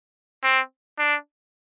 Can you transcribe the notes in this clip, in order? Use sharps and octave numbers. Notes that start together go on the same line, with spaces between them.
C4
D4